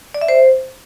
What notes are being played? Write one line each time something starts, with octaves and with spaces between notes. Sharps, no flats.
D5
E5
C5